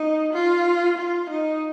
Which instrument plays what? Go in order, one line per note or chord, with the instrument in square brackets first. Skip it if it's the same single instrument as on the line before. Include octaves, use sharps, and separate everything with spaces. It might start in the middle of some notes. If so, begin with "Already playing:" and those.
Already playing: [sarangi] D#4
F4
F4
D#4